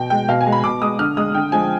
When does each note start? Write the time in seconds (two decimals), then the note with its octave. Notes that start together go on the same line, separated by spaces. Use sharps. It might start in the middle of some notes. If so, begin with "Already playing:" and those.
Already playing: B2 G5
0.10 G#3 G5
0.29 B2 F5
0.41 G#5
0.46 G#3
0.52 B5
0.64 B2 D6
0.82 G#3 D#6
0.99 D3 F6
1.17 G#3 D#6
1.35 D3 G5
1.52 F3 G#3 G#5